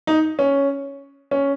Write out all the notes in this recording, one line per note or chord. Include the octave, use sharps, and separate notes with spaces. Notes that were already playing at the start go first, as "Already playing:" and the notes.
D#4
C#4
C#4